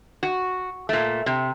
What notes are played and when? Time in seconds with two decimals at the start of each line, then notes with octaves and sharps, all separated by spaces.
0.23 F#4
0.89 A#2 A3
1.26 C3